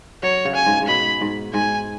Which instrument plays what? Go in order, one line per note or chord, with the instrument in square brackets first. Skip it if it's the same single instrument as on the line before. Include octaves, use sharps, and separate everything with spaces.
[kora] F#3 [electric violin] C#5
[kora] C#3
[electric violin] G#5
[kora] G#2
G#2
[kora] B2 [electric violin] B5
[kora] G#2
[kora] G#2 [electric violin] G#5